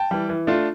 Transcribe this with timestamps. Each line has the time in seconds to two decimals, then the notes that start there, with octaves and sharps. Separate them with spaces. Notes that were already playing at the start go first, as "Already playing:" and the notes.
Already playing: G5 A5
0.11 E3 G3
0.29 E3
0.47 A3 D4 F4